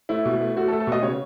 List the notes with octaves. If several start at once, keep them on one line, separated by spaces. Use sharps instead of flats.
A3 E4
B2
A3
A3 F#4
A4
A3
A4
B2 D#5
C#3 C#5